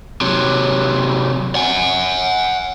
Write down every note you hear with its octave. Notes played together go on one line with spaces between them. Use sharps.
C3 F#3
F#5 G#5